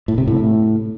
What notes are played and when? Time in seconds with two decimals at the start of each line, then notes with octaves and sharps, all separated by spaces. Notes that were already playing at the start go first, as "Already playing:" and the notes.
0.08 A2
0.18 C3
0.28 A2